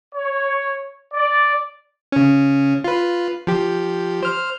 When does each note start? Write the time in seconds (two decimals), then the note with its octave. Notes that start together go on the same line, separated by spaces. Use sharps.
0.14 C#5
1.13 D5
2.12 C#3 C#4
2.84 F4 B4
3.47 F3 G4
4.23 C5 F6